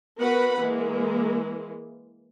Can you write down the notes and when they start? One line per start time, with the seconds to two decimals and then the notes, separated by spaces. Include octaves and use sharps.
0.20 B3 F#4 A#4 B4 F#5 B5
0.62 E3 G#3 A#3